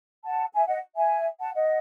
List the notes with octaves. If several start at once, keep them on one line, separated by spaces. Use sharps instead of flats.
F#5 A5
E5 G#5
D#5 F#5
E5 G#5
F#5 A5
D#5 F#5